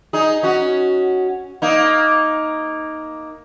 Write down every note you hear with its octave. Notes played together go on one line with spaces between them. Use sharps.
D#4 G#4
C#4 F#4
A#3 D#4